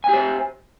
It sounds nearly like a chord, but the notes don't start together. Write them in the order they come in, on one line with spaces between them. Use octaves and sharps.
G#5 G4 C5